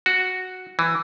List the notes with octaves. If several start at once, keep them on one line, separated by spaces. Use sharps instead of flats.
F#4
E3